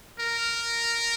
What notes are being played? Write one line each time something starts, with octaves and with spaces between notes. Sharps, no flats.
A#4